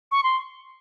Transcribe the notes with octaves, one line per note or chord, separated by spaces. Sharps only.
C#6
C6